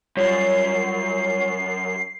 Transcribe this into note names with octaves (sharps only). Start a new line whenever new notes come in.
F#2 G3 F4 C#5 C7